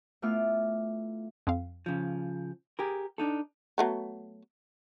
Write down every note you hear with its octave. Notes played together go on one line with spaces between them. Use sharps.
A3 B3 E4 F4 D6 F6
F2 C4 F5
C#3 F3
G4 G#4 A#4
D4 D#4 A4
F#3 A3 B3